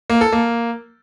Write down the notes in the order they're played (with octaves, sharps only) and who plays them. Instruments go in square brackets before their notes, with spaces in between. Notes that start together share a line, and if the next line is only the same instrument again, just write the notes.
[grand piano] A#3
A4
A#3